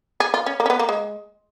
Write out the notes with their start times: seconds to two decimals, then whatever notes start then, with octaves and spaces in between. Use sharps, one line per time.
0.20 G#4
0.34 F4
0.46 C#4
0.60 A#3
0.66 C#4
0.70 B3
0.79 A#3
0.89 G#3